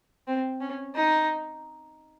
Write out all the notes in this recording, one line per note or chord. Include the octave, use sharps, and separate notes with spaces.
C4
C#4
D#4